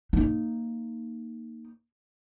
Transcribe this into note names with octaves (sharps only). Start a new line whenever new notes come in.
A#3 D#4